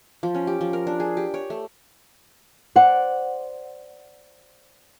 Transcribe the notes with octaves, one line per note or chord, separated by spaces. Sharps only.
F3
C#4
G4
F3
A#4
D4
G#4
G4
C#5
A3
C5 D5 F#5